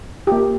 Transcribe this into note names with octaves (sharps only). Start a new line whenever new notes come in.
A#3 F4 G4